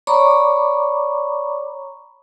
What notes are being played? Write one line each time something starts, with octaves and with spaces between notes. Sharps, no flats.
C#5 D5 A#5 B5 C#6 D6